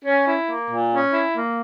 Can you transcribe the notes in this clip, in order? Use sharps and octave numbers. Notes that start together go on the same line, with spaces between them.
C#4
E4
A#3
A#2
C#4
E4
A#3